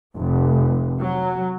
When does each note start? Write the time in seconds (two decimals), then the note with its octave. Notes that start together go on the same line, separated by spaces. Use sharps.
0.16 F1
1.00 F#3